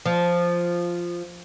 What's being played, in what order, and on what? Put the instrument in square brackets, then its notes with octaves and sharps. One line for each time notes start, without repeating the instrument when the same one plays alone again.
[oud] F3